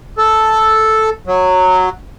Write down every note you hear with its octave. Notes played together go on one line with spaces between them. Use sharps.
A4
F#3